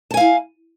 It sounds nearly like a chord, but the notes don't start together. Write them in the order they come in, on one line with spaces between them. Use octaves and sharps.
A5 G#5 F5 E4